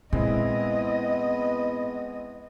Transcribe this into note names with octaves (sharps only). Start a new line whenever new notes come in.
A#2 G#3 B3 C4 E4 D#5